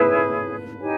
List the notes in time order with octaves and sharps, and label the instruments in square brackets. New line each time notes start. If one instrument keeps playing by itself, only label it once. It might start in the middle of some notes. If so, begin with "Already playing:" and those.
Already playing: [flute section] E4 G#4 C#5 [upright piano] B4
[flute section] D#4 G4 C#5 G#5